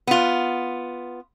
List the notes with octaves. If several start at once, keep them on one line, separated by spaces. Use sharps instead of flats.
B3 F4